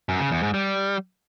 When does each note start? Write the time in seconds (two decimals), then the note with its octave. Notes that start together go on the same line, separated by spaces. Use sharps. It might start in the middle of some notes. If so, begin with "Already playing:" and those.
0.09 F#2
0.20 C#3
0.31 E2
0.43 G#2
0.54 G3